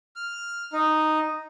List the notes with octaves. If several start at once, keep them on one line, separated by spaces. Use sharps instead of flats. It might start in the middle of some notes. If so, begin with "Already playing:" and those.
F6
D#4